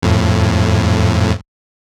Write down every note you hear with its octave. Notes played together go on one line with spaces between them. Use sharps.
F2 A2